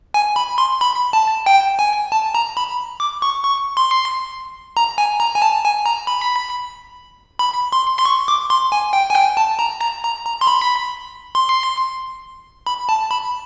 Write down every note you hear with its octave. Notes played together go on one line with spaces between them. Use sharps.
G#5
B5
C6
B5
A5
G5
G#5
A5
A#5
B5
D6
C#6
C#6
C6
A#5
G#5
A#5
G#5
A5
G#5
A#5
B5
B5
C6
C6
C#6
D6
C6
G#5
G5
G#5
G5
A5
A#5
A#5
A#5
A#5
C6
B5
C6
B5
A5
B5